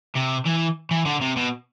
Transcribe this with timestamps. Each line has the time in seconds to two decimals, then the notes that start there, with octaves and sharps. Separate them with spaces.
0.16 C3
0.46 E3
0.91 E3
1.05 D3
1.21 C3
1.36 B2